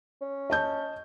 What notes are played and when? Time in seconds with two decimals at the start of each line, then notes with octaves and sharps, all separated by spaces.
0.21 C#4
0.50 D#5 A5 G6